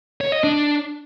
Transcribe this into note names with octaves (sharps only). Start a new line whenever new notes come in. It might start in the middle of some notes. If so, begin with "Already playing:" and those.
C#5
D#5
D4